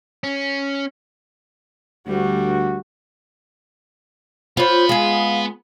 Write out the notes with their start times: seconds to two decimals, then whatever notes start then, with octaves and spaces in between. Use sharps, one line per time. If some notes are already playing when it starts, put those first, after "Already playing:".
0.24 C#4
2.07 D2 G3 F#4
4.57 B3 F4 C5 C#5 B5
4.89 G#3 G#4 F5